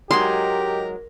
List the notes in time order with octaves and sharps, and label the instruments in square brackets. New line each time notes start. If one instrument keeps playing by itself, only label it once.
[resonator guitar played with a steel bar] G#2 F#3 G#3 [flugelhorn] G4 [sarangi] A#4 [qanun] C6